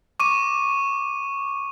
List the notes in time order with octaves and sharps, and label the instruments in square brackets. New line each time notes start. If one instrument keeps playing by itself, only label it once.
[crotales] C#6 D6 D#7